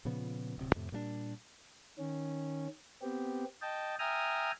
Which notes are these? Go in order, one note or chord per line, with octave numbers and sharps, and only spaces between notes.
A#2 C#3 F3 B3
D1 C3
F2 A2 C3
A#2 G3 G#3 D4
D#3 C#4
B3 C4 G4
D#5 G5 A5
E5 G5 G#5 A#5 D#6 F6